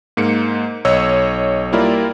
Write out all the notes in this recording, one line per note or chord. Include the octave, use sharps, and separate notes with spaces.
G#2 A#3 C#7
B1 C#5 D#5 E6
G3 A#3 E4 F4 A#4 D5